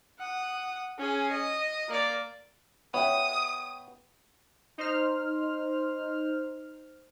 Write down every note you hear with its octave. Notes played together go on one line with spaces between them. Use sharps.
F#5 D#6
C#4 G#4
D#5
A#3 D5
B3 C#5 E5 G5 D#6
D#4 C5 F6